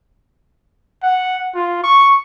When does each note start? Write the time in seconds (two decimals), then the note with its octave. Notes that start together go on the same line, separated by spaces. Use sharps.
1.03 F#5
1.55 F4
1.84 C#6